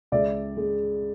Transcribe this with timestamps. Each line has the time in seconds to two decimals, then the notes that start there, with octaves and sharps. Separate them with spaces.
0.12 C#2 D5 E5
0.57 G#3